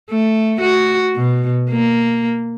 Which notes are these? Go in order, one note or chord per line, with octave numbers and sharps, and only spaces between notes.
A3
F#4
B2
A#3